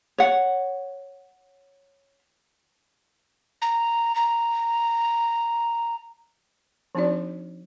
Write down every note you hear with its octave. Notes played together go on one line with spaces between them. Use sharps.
C#5 F#5
A#5
A#5
F3 C4 D4 D#4 F#4 D5